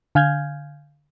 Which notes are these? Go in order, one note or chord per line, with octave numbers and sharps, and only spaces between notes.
D3 F5 G#5 F6 G6 G#6